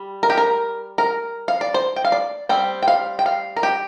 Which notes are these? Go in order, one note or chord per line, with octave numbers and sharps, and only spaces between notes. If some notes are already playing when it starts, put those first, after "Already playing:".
Already playing: G3
A#4
G4
A#4
A#4
F5
D5
C5
G5
F5
D5
G3 C4 G5
G5
F5
G5
F5
A#4
G4